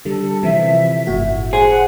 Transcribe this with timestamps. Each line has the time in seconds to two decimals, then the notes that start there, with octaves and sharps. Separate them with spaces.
0.05 D3 G3 A4
0.43 C3 E3 F3 E5
1.07 G1 A2 F#4
1.53 G#4 C5 F#5